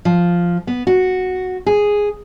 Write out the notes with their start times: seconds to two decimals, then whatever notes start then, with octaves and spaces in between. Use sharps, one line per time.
0.05 F3
0.67 B3
0.87 F#4
1.66 G#4